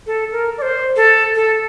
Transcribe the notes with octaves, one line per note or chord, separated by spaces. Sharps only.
A4
A#4
D5
C5
A4
A4